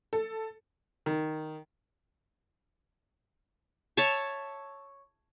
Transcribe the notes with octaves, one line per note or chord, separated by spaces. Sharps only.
A4
D#3
C#5 E5 A5 C#6